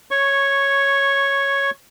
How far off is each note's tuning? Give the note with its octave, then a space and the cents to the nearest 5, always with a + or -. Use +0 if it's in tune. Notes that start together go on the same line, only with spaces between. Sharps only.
C#5 +0 C#6 -10